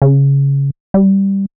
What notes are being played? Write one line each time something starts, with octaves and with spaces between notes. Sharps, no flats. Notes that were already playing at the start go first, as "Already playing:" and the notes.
C#3
G3